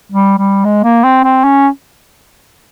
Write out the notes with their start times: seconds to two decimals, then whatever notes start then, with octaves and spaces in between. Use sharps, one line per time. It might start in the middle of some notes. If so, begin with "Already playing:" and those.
0.12 G3
0.38 G3
0.65 G#3
0.84 A#3
1.04 C4
1.24 C4
1.44 C#4